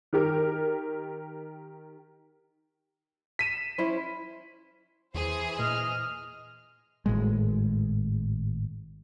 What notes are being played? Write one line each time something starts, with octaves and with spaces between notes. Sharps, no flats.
D#3 G4 A#4
B6 D#7 E7
C#4 E4 C5
E2 E3 G#4 C5
A#2 D#5 F6
G#1 A2 G#3